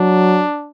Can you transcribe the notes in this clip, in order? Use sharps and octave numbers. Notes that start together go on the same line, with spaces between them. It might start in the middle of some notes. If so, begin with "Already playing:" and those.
Already playing: F#3 D4